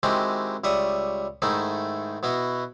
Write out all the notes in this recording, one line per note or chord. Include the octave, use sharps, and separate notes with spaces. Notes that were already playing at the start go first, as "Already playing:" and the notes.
D#3 G#3 C4 E4 F#4 G4
C#2 G3 E5 C#6 D#6
G#2 D#3 A3 D#4 E4
B2 B3 E4 F#4